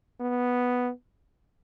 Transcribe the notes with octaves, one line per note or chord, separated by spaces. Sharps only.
B3